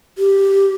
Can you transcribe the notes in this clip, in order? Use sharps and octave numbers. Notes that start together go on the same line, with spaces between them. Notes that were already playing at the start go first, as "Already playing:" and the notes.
G4